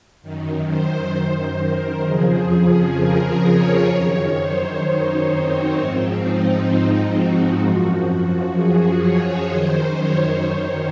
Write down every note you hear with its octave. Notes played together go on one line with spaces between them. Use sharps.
F#2 D#3
C5
C5
A#4
F2 C#3 F3 G#4
G#4
A#4
C#5
F#2 D#3 C#5
C5
D#4
C4
G#2 F3 C4
D#4
F#4
F#2 F3
G#4
C#5
F#2 D#3 C5
C#5
C5